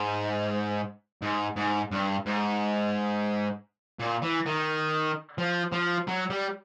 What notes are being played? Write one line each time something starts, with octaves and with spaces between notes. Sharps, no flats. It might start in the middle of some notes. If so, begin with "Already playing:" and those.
Already playing: G#2
G#2
G#2
G2
G#2
A#2
E3
D#3
F3
F3
F#3
G3